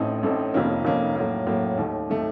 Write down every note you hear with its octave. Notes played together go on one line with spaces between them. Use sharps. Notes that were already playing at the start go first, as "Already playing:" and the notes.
Already playing: A1 A2 A3 C4 D#4
A1 A2 A3 C4 D#4
F1 F2 D#3 A#3 C#4
F1 F2 D#3 A#3 C#4
A2 F#3 A#3
A2 F#3 A#3
D#2 D#3 A3
D#3 A3